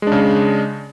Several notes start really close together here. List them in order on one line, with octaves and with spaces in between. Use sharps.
G#3 D4 C#3